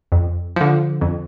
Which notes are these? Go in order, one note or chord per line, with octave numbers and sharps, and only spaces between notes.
F2
D3 F3
F2